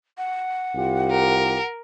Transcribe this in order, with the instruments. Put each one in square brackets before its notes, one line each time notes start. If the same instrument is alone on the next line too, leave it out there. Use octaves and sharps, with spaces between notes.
[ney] F#5
[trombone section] C2 F4 G4
[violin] A#4